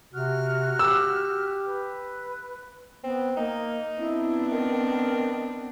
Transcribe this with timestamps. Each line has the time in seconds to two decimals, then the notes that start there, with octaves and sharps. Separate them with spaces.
0.13 C3 F#4 F6 F#6
0.79 G4 E6
1.64 B4
3.03 B3 C4
3.37 A#3 D#4
3.99 B3 C4 D4 E4
4.52 D#3 A#4